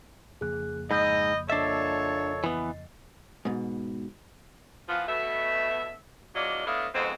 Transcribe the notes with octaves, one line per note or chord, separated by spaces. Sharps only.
F2 C#3 A#3 G#4 F#6
G#2 D#5 B5 E6 G6
A#2 D4 A4 C#5 D#5 E5 A6 C7
E3 B3
G#2 B2
E3 F3 B3 F4
B2 A3 E5
E2 F#3 D4 F4 D5 D#5
A2 B3 D4 E4 D#5 F5
F2 G#2 F3 G#3 B3 C4